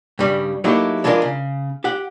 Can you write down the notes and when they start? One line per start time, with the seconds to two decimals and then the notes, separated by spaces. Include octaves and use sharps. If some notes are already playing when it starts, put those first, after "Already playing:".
0.19 G2 C#3 G3
0.64 F#3 A3 A#3 D#4 E4 G4
1.04 E3 G#3 D4 F4 G4 A#4
1.22 C#3
1.84 G4 F#5